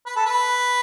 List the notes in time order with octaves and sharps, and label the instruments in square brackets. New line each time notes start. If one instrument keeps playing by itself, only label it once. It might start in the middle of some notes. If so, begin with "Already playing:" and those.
[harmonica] B4
A4
B4